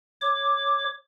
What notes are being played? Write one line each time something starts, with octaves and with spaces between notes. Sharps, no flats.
C#5 D6